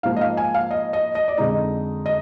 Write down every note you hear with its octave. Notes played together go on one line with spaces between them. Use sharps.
G#2 F3 A#3 F5
D#5
F5
G#5
F5
D#5
D#5
D#5
D5
F2 D3 G#3 D#4 D#5
D#5